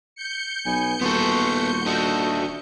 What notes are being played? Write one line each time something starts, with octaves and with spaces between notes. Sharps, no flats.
G6 C#7
B1 B3 G#5
D#1 B3 F#4 A4 C6
D4 F#4 A4 D#5